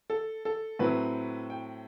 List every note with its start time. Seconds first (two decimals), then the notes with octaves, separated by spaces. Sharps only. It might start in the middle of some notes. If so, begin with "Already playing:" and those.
0.10 A4
0.45 A4
0.79 A2 F#3 C4 E4 B4
1.50 G5